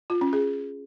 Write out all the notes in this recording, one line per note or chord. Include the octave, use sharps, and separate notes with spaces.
F4
C#4
G#4